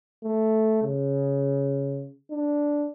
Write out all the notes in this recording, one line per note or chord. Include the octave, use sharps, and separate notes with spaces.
A3
C#3
D4